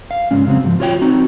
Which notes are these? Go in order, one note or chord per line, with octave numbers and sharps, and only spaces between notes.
F5
C#2 G#2 G#3 C#4
F2 C#3 F#3 C4
G#2 F3
F4 F#4 C#5 D5 G5
C4 D#4 F#4